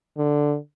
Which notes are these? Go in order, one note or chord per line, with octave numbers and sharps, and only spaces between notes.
D3